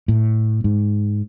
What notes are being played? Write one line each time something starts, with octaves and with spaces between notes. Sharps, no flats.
A2
G#2